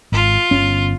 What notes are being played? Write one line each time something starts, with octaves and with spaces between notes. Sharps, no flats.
G#1 F4
G1 C#4